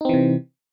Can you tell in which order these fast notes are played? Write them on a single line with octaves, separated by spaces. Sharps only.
D#4 C4 E3 C3